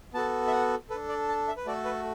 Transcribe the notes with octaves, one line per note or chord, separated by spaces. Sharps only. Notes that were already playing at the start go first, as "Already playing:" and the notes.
B3 F#4 A4 A5
E5
F#5
D4 A4 B4
D5
A5
E5
B4
A3 F#4 A4 D5
B4